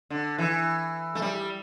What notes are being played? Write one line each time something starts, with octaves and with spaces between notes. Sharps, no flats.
D3
E3
A3
G3